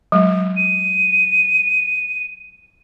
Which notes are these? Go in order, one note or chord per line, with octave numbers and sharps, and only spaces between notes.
F#3 G#3
D#7